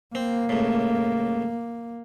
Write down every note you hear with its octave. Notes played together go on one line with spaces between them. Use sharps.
A#3 C4
C#2 A2